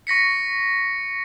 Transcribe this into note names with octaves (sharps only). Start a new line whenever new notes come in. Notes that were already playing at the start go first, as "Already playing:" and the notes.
C#6 A#6 B6 C#7